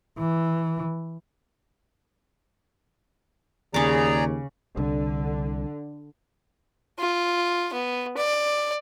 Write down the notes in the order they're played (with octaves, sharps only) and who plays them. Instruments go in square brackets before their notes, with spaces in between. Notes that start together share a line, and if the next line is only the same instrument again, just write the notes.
[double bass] E3
[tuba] D#2 [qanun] C#3 D6 [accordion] G#4 D5 A#5
[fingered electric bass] C2 [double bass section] D3
[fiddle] F4
B3
D5